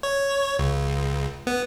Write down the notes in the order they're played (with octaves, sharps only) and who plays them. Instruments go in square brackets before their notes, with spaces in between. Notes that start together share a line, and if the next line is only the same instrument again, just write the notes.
[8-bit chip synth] C#5
C#2
B3